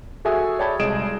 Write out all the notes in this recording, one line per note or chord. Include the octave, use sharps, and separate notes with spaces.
F#4 G#4 A4 E5 G#5 D#6
C#5 D5 G5 A5 B5 G#6
C2 G#3 G#4 D#5 D7 E7